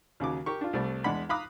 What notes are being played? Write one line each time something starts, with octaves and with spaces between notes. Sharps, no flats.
D#2 C#3 F#3 D6
G4 A#4 C#6
D4 F4
C2 G3 A3 D5
E2 G#3 D4 F#5 B5
F5 A#5 B5 D6 D#6 F#6